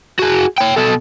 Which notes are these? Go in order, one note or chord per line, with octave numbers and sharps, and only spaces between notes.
F#4 G#4
C#5 G5
B2 A4